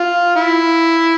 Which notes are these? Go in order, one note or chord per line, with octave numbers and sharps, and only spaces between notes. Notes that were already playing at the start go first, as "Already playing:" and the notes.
Already playing: F4
E4